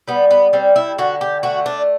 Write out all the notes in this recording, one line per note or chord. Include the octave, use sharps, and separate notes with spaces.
G3 B3
B3
G3 C4
E4
D3 F#4
G4
A3 F#4
D4